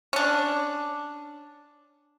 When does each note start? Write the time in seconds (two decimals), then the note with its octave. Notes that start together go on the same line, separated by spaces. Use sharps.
0.13 C#4 D4